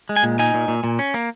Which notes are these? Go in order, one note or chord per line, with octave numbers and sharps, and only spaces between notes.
G#3
G#5
A#2
D#4 G#5
A#2
A#2
A#2
C#4
A#3